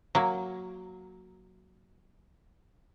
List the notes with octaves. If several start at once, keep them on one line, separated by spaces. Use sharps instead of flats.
F#3 A#3